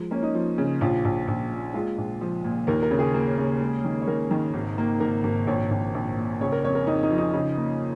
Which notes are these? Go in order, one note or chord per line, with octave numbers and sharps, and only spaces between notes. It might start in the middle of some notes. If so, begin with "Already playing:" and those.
Already playing: F3 G#3
A#3 C#4
D#4
F3
C#3
A#1 F4
A#1
A#1
A#2
G#3 F4
A#1
F3
A#2
D#2 A#4
A#4
C#3
G#4
A#3
C#3
G#3
D#3
C#5
D#3 A#4
D#3
G#1
A#3
G#1 A#4
G#1
A#1 C#5
A#1
A#1
A#2
C#3 C#5
A#4
F2 C#5
A#4
F2 D#4
D#4
F3
D#4
C#3 D#4
A#3